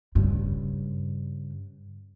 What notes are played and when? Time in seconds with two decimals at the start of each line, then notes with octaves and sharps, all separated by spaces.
0.15 G2 C#3